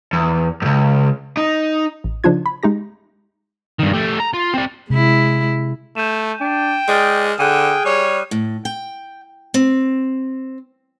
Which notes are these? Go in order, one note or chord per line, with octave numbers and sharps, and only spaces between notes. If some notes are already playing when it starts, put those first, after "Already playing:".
E2
C#2 F#2
D#4
A1
C#3 F3 D4 D#4 F4 G#6
B5
G#3 D#4 G4 A#6
G2 D#3
A3 G4
A#5
F4
C4 D5
C3 G#3 E4
A3 G6 D#7 E7
D4 G5
G#3 D5 D#6 F6
D3 G#4 G5 F#6 D#7
G3 C#5
A2
G5
C4